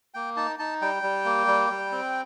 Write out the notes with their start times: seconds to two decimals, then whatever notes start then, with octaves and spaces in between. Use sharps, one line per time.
0.14 A#3 G5
0.36 D#4 A5
0.59 D#4 A5
0.81 G3 G5
1.03 G3
1.25 A#3
1.47 G3
1.70 G3
1.92 C4